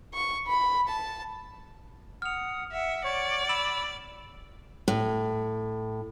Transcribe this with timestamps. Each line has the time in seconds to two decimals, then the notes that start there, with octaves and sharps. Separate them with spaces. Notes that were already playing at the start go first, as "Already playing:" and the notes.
0.14 C#6
0.48 B5
0.89 A5
2.22 F#5 D#6 F6 F7
2.72 E5 F#5
3.04 C#5 D5
3.49 B5 E6 E7 F#7
4.88 A2